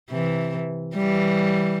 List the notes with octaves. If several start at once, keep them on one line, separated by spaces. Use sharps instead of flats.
C3 E3
E3 G3